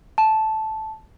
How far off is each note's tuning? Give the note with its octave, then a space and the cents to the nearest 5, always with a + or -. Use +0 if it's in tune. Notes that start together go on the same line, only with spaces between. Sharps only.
A5 -10